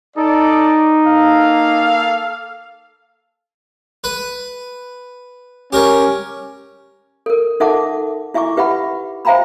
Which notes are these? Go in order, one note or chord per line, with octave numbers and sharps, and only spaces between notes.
D#4 A4 D5
A#3 A4 F5
B4
C#4 G4 A#4 C#5
A4 A#4
D#4 A4 E5 F#5 A5 D6
E4 E5 G#5 C#6 D6
G4 B4 E5 F#5 B5
C5 E5 F5 G5 A#5 B5